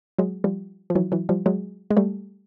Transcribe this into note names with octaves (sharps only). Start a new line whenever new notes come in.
F#3 G#3
F3 G3
F3
E3 F#3
E3 F#3
F3 G3
F#3 G#3
G#3
G3 A3